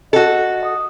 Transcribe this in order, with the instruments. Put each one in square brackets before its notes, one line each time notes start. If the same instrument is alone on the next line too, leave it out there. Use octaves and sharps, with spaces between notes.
[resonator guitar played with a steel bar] F#4 A4 [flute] D#5
[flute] D#6